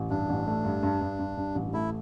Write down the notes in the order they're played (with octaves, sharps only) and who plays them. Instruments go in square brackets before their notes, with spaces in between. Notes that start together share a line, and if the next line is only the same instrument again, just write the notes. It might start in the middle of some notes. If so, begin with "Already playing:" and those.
Already playing: [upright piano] A1
[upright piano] G2 [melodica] D4
[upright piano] A1
A3
G2
G2
G2
G2
G2
A1
[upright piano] A3 [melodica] E4